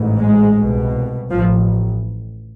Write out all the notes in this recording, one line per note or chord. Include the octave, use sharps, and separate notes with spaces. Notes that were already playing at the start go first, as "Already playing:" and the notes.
Already playing: A1 G#2
G#3
C2 B2
A1 F3